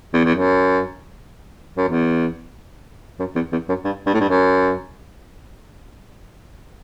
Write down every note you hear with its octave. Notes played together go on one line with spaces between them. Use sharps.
E2
E2
F#2
F#2
E2
F#2
E2
E2
F#2
G2
G2
A2
G2
F#2